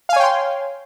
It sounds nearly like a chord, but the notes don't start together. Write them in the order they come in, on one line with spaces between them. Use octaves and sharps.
F5 G#5 C#5 G5 C6